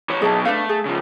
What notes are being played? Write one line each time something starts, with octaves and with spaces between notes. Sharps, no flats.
E3 C#5
B2 F#3 G#4 E5 A5
A3 D4 B4 F5
G#4
C#3 F3